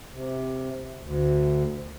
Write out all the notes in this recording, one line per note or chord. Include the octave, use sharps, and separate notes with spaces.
C3
D2